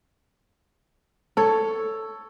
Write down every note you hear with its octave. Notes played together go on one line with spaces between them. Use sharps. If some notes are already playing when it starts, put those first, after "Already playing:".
A4 C#5